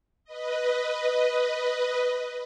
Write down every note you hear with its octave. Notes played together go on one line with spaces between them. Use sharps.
B4 D#5